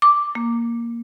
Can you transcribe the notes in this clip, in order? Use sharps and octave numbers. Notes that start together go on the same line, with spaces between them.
D6
A#3